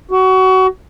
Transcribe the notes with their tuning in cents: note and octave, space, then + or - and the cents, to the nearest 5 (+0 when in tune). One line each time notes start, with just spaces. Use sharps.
F#4 +25